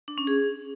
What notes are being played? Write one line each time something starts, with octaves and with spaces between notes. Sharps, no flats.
D4
C#4
G#4